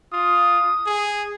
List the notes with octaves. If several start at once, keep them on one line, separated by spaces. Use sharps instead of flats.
F4 D#6
G#4